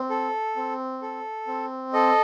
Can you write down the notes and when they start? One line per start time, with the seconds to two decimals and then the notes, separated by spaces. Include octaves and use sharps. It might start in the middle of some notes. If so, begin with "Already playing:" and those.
Already playing: C4
0.10 A4
0.56 C4
1.02 A4
1.47 C4
1.93 A4 D#5